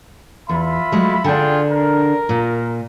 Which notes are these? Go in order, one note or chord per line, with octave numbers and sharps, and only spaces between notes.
E2 F4 E5 B5
F#3 G#3 A3
D3 D4 F4 G#4 G5
A#4
A#2